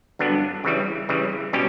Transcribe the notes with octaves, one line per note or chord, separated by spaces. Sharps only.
G2 D3 F#3 B3 D4
C#3 E3 G3
C#3 E3 G3
B2 G3 C#4 G4